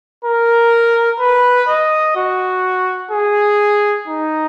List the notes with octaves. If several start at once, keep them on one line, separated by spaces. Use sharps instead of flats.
A#4
B4
D#5
F#4
G#4
D#4